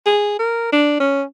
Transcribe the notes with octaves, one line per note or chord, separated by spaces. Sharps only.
G#4
A#4
D4
C#4